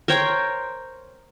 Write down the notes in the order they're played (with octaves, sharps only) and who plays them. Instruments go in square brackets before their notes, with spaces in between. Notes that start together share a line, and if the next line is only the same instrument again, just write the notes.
[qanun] A#4 C5 C#5 G5